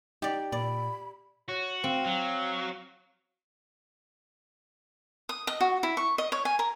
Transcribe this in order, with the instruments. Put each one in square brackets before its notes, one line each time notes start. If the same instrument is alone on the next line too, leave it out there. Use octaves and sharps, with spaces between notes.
[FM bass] D#4 [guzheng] G4 D5
[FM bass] A#2 [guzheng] D5 [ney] B5
[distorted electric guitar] F#4 [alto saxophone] C#5
[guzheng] C4 [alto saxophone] F5
[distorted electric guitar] F#3
[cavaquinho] D#6
D#5
F#4
E4
C#6
D#5
C#5
G#5
A#4